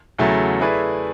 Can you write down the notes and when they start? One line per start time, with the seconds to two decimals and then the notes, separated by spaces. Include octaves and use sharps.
0.18 E2 C#3 F#3 A3 E4
0.60 A3 E4 G#4 B4 D5